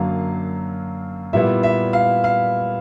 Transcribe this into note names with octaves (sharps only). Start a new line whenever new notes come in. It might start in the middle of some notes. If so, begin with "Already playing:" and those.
Already playing: F#2 D3 F#3 A#3 F5
A#2 G3 B3 E4 E5
E5
F5
F5